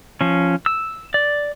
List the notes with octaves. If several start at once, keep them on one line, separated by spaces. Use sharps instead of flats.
F3 C#4
E6
D5